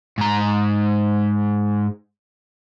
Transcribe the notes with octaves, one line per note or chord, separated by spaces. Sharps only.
G#2 A#5